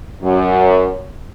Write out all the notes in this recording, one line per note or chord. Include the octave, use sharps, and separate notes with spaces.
F#2